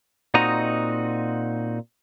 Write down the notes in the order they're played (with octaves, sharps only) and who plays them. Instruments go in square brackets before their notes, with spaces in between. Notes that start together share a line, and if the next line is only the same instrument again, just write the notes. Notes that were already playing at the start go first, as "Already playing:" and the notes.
[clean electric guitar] A#2 C4 D#4 F#4 D#5 A#5